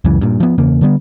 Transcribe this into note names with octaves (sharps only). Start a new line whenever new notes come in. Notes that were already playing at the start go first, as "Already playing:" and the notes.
C#2 F#2 C#3 E3
G2 A#2
F3 B3
E2 C#3 A#3
D3 G3 B3